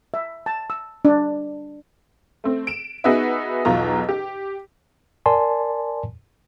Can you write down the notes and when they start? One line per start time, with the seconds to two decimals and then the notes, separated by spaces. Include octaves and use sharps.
0.14 E5
0.46 A5
0.70 E6
1.05 D4
2.44 A3 C4
2.67 D7 E7
3.04 B3 D#4 F#4 G#4 B4 E5
3.65 B1 E2 B2 F4 A#5
4.09 G4
5.26 A#4 D5 G#5 A5 C6